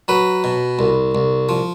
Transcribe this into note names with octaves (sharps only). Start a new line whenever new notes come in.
F#3 B4
B2
C2
C2
F3